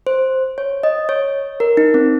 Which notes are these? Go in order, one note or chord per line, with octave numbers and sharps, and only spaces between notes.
C5
C#5
D#5
C#5
A#4
D#4
C4